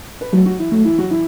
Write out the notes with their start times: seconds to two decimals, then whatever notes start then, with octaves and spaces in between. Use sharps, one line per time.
0.21 B4
0.33 F#3 A3 A4
0.46 F#3 F#4
0.59 E3 E4
0.72 F#3 A3 F#4
0.85 E3 E4
0.98 F#3 F#4
1.11 E3 E4